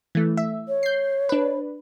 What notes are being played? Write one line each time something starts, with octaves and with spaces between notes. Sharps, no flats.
E3 A3
E5
C#5
G6 C7
D4 B4